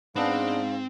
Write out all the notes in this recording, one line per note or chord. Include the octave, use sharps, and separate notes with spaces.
G#2 G#3 B3 C4 D4 F5